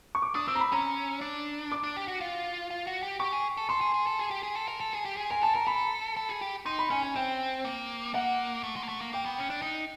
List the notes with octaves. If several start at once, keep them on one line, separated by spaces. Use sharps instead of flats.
C#6
D6
D4 D#6
C4 E6
A#5
B5
C#4 A#5
D4
D6
D4
G4
F#4
F4
F4
F#4
G4
G4 C#6
G#4
A4
A4 C6
G#4
G#4
A4
G#4
G4
G#4
A4
A#4
A4
G#4
G4
G#4
A#4 G#5
A4 A5
A#4 A#5
A4 B5
A4
G#4
G4
D#4 C6
B5
C#4 G#5
G#5
C4 G5
A#3
A#3 F#5
A3
G#3
A#3
A3
A#3
A#3 G5
B3
C#4
D4
D#4